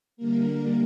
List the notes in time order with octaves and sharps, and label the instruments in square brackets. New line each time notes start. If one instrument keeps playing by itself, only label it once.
[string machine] D3 G3 A#3 A#4